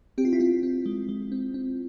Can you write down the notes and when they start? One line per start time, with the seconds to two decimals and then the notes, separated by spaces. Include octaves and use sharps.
0.18 C4 G4
0.25 F4
0.33 E4
0.40 C4 F4
0.63 C4
0.86 G#3
1.09 G#3
1.32 C4
1.54 C4